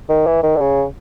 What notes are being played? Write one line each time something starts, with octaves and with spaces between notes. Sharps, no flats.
D#3
E3
D#3
D3
C#3